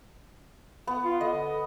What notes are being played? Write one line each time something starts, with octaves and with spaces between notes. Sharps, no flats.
B3
F4
D3 D#5